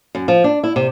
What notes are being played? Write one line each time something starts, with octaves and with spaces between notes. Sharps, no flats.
F#2
F3
D4
E4
C3